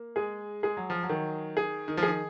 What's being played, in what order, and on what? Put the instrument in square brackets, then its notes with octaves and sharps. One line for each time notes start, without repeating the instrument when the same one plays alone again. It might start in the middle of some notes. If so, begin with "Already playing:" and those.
Already playing: [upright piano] A#3
[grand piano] G#3 [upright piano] G#4
[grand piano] G#3 [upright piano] G#4
[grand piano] F#3
F3
F#3
[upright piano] D#3
G#4
[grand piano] D#3
F3
[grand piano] D#3 [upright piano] G#4